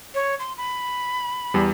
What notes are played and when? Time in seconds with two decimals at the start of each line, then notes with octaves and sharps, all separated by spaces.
0.15 C#5
0.39 C6
0.58 B5
1.54 E2 G3